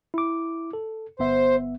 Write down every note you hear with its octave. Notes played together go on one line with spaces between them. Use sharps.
E4 D6
A4
G1 B3 C5 E5